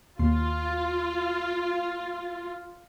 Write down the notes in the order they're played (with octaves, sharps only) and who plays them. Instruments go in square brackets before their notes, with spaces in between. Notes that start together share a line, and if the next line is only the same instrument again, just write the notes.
[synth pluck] D#2 C6 [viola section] F4